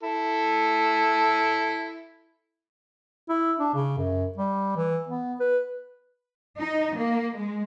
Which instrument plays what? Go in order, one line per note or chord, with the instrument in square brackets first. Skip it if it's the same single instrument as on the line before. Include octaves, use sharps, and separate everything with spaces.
[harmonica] E4 A4
[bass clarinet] E4
D4
C#3
F#2
G3
E3
B3
B4
[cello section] D#4
A#3
G#3